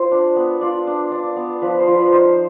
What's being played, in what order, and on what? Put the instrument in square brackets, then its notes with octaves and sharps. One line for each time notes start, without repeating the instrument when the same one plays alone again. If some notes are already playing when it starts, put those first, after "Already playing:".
Already playing: [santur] F4 C5
D4
B3
F4 D5
D4
D4 D5
B3
F3 B4
C5
F3
B4
D#4 C5